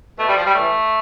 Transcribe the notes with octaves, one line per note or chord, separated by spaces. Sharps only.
B2 A3
G3
F3
G3
A2 E3 A3